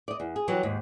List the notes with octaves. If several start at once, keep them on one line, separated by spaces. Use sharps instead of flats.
D5 D#5
E2
G#4
E3 F#3 G3
D#2 G#2